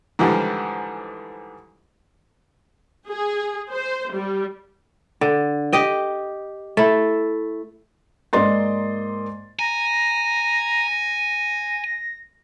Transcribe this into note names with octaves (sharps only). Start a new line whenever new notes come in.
G#2 D3 E3 F3 G3
G#4
C5
G3
D3
G4 D#5 G5
A3 E4
G#2 A#3 D5 D#5 C6 A6
G#5 A#5
A#6